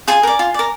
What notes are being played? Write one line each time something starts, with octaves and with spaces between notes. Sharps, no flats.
F4 G#4 G#5
A#4 D5
F4
A#4 D5